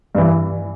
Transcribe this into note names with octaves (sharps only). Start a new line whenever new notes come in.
G2 E3